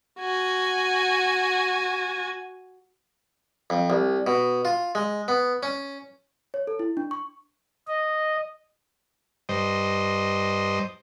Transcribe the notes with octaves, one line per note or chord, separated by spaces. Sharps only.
F#4 G#5
F2
C2
B2
F4
G#3
B3
C#4
C#5
A4
E4
D4
C#6
D#5
G2 C5 D#5